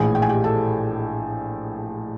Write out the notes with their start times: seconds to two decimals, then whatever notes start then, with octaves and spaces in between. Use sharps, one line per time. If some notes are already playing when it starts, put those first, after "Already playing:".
Already playing: A#1 A2 E3 G#4 G#5
0.15 G5
0.22 G#5
0.29 G4 G5
0.44 A4 A5